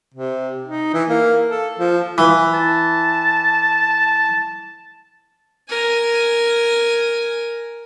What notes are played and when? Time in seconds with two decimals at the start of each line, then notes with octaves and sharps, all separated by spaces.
0.14 C3
0.64 D#4
0.94 E3
1.09 A#3
1.50 A4
1.79 F3
2.18 E3
2.54 A5
5.69 A#4 G#5